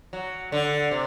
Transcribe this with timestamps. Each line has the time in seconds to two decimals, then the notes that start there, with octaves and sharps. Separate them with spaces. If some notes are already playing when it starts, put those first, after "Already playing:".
0.13 F#3
0.52 D3
0.91 C3